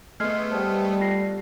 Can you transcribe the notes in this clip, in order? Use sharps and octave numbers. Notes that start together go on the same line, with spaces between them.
G#3 A3 B3 F6 G#6 C7
G3 C5 D5 F#5 A5
F4 B4 A#6 C7